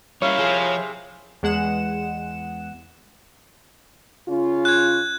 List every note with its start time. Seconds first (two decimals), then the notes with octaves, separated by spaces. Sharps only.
0.22 G3 C#4 E4 A#4 C#5 F5
0.37 C3 F3 G#4
1.43 E2 G#3 F#5 E7
4.28 C#3 C#4 F4
4.65 F#6 G#6